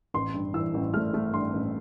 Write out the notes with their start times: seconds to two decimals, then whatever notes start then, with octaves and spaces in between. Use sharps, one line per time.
0.14 A1 C6
0.34 G2
0.54 E3 E6
0.74 A1
0.94 A3 F6
1.14 A3
1.33 G2 C6
1.53 A1